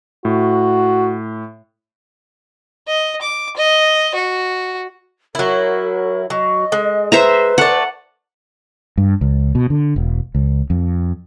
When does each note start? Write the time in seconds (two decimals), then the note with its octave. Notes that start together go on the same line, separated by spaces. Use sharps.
0.25 A2 F#4
2.87 D#5
3.21 D6
3.57 D#5
4.15 F#4
5.35 F#3 E4 A#4
6.30 F#3 D#5
6.72 G#3
7.12 B4 C5 E5 A#5
7.58 A3 D5 F#5
8.98 G2
9.21 C#2
9.55 B2
9.70 D3
9.96 E1
10.35 C#2
10.70 F2